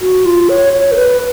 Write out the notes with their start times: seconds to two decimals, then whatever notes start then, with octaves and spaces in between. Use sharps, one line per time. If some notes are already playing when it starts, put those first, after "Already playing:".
0.02 F#4
0.26 F4
0.49 C#5
0.73 C#5
0.92 A#4
0.96 B4